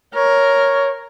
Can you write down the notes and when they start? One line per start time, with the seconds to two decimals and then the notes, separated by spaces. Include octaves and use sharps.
0.15 A#4 C#5